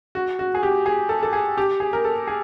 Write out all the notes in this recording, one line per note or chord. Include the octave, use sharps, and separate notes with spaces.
F#4
F#4
G#4
G4
G#4
A4
A4
G#4
G4
G#4
A#4
A4
G#4